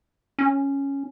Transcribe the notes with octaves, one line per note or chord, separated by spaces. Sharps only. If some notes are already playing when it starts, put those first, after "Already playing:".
C#4